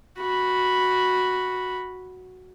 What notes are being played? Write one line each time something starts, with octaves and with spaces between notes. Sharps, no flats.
F#4 B5